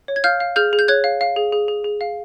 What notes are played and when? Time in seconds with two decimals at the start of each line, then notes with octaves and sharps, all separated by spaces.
0.08 C#5
0.16 G#6
0.24 F5 F6 G6
0.40 F5
0.56 G#4 F6 G6
0.73 G#4
0.79 G6
0.88 C#5 F#6 G#6
1.04 F5
1.21 F5
1.36 G#4
1.52 G#4
1.68 G#4
1.84 G#4
2.01 F5